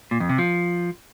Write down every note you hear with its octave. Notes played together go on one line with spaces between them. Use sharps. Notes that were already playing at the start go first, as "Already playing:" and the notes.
A#2
F2
C3
F3